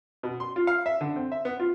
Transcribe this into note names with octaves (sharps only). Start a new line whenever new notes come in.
B2
C6
F4
F5
E5
D3
C4
E5
B3
F4